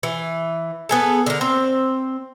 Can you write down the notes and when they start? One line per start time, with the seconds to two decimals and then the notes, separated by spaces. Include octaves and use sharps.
0.03 E3
0.89 B3 G#4 A4
1.26 D3 A#4
1.41 C4